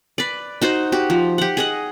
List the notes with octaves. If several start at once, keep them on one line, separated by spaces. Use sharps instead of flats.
B4 D5
D#4 F#4 C5
F#4 G4
F3
G4 F#5
G#4 D#5 F#5